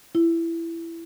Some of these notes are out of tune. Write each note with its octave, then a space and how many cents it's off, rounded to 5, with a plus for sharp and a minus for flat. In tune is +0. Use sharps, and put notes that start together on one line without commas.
E4 +15